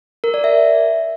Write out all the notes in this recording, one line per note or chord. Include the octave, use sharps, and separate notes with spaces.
A#4
D5
E5